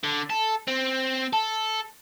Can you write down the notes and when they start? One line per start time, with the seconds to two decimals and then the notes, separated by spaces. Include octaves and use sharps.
0.04 D3
0.30 A4
0.68 C4
1.33 A4